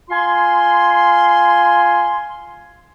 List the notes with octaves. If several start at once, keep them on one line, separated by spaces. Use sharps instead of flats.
F4 G#5 C6